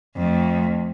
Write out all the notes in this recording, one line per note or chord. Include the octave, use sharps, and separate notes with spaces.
F2 A3